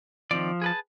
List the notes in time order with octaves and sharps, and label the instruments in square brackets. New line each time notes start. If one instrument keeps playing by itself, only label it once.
[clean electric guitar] D#3 C4 D5 [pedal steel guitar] F3
[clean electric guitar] G#4 B4 A5